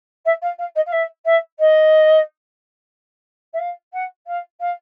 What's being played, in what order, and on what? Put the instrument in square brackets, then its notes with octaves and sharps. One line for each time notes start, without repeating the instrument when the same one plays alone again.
[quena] E5
F5
F5
D#5
F5
E5
E5
D#5
E5
F5
F#5
F5
F5